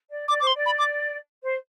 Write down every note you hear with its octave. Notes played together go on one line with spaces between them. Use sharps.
D5
D5 D6
C5 D6
C6
D5
B5
D6
C5